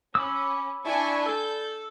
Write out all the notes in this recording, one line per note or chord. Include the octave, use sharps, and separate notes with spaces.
C#4 B5 D6 E6
D4 E4 G#5 C#6
A4 G6